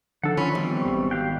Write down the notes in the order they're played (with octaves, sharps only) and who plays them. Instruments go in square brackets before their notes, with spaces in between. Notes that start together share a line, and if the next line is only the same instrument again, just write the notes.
[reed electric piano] D3 D#3 [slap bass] F3 D4 [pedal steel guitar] A4 F#5
[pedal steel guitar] E3 F4 B5 [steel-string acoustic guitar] C#4
[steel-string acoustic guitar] B2 [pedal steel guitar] E3 G3 C4
[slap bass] G#1 G#2 [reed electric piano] G4 C#6
[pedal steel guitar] G4 F5 G5 [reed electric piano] F#6